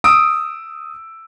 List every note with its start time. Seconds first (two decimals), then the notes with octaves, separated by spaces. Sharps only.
0.04 D#6 E6 D7